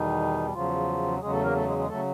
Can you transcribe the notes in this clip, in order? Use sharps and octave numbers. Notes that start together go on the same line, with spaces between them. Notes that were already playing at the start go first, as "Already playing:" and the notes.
Already playing: E2 B2 D#3 G3 D#4
E2 C#3 F3 F#3 F4
E2 C#3 F#3 G#3 G#4
A3 A4
A#3 A#4
A3 A4
G#3 G#4
G#3 G#4
C#3 F#3 A3 A4